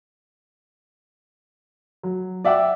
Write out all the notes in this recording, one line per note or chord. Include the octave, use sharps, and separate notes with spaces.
F#3
D5 E5 F#5 G5 D6